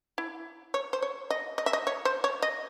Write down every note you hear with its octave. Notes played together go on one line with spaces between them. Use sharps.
E4
C#5
C5
C#5
D#5
D#5
E5
D#5
C#5
C5
C#5
D#5